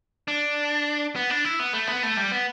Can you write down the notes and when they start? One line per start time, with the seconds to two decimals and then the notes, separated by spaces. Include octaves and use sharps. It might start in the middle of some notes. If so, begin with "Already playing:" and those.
0.28 D4
1.16 B3
1.30 D4
1.45 E4
1.59 B3
1.73 A3
1.87 B3
2.03 A3
2.17 G3
2.31 B3